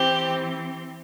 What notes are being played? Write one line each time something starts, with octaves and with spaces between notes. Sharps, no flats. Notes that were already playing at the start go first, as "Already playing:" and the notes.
Already playing: E3 C4 G4 C5